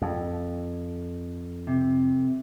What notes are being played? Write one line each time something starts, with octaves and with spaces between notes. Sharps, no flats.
F2
C3